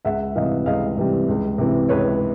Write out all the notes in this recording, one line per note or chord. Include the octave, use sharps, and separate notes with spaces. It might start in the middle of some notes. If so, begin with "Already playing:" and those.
C#2 E5 F#5
C3 E3 G3 D#5 F5
C#2 D#5 F5
C3 E3 G3
C#2
C3 E3
C#2 B4 C#5